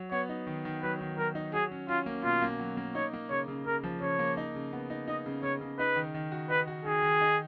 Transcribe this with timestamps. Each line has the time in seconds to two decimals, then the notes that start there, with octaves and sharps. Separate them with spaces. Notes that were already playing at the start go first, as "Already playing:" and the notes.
Already playing: F#3
0.11 B3 C#5
0.29 D#4
0.47 D#3
0.65 D#3
0.83 F#3 B4
1.01 D#3
1.18 F#3 A#4
1.35 D#4
1.54 F#3 G#4
1.71 C#4
1.88 C#4 F4
2.06 A#3
2.24 B2 F4
2.42 A#3
2.59 F#3
2.77 A#3
2.95 D#4 C#5
3.13 A#3
3.30 C#3 C#5
3.48 C#3
3.66 C#3 A#4
3.84 F3
4.01 C#3 C#5
4.19 A#3
4.37 D#4
4.55 C#3
4.73 B3
4.90 D#4
5.08 D#4 D#5
5.26 C#3
5.43 C#3 C#5
5.61 C#3
5.79 D#4 B4
5.96 D#3
6.14 D#3
6.32 F#4
6.50 D#4 B4
6.67 F#4
6.85 D#3 G#4
7.02 D#3
7.21 D#4